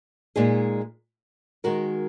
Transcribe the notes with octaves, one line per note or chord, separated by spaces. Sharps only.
A#2 G#3 D#4 G#4
D#3 G#3 F#4 A#4